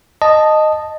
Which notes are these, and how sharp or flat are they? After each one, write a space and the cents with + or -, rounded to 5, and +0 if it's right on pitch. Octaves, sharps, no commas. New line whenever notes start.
D#5 -10 A5 +0